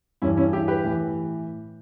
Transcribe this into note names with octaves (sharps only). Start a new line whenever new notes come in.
G2 E3 C#4 E4
C#4 E4
E4 G4
G4 B4
A2 E3